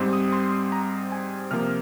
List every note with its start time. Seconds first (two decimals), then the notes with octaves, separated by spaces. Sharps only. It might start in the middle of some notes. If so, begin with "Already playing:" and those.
Already playing: G#2 G3 C4
0.13 D#6
0.33 C6
0.72 A#5
1.12 G#5
1.51 C3 F3 A#3 F6